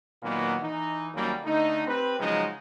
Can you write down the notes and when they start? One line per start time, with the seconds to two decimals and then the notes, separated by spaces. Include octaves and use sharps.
0.23 A#2 D#3 F#3 A#3 B3
0.61 E3 D#4
1.14 D#2 F#3 G3 A#3 C#4
1.43 D3 A3 D#4
1.87 C4 G4 B4
2.19 C#3 F3 F#3 G#3 D#4